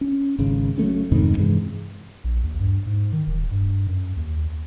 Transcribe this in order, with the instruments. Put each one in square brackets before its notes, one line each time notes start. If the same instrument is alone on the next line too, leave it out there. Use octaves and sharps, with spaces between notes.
[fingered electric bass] C#4
G#1 C#3
F#3 G#3 A3 C#4
F2 G#2 C3 D#3
G2 C3 E3 G#3
[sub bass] A#1
D#2
G2
G#2
D#3
D#1
G2
F#2
D#2